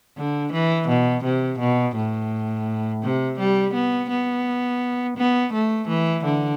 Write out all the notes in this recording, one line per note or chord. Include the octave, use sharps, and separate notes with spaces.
D3
E3
B2
C3
B2
A2
C3
G3
B3
B3
B3
A3
E3
D3